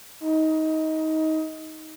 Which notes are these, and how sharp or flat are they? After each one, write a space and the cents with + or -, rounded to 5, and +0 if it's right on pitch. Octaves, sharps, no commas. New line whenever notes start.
D#4 +20